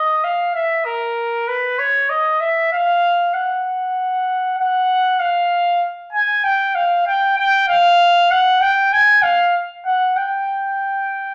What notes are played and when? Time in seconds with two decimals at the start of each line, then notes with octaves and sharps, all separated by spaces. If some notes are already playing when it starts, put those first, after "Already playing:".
Already playing: D#5
0.24 F5
0.55 E5
0.85 A#4
1.48 B4
1.79 C#5
2.10 D#5
2.40 E5
2.72 F5
3.34 F#5
4.58 F#5
5.20 F5
6.13 G#5
6.44 G5
6.75 F5
7.06 G5
7.38 G5
7.68 F5
8.31 F#5
8.61 G5
8.93 G#5
9.23 F5
9.86 F#5
10.16 G5